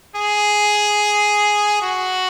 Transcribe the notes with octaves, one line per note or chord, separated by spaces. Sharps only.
G#4
F#4